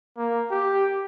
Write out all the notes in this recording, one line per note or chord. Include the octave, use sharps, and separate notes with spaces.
A#3
G4